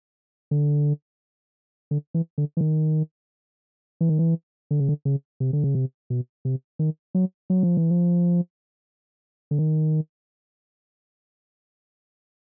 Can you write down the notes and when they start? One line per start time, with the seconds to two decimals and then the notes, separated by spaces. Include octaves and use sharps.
0.51 D3
1.91 D3
2.14 E3
2.38 D3
2.57 E3
2.61 D#3
4.01 E3
4.09 D#3
4.19 E3
4.71 D3
4.79 C#3
4.89 D3
5.05 C#3
5.40 C3
5.53 D3
5.64 C#3
5.75 C3
6.10 B2
6.45 C3
6.79 D#3
7.15 F#3
7.50 F#3
7.63 F3
7.77 E3
7.90 F3
9.51 D3
9.59 D#3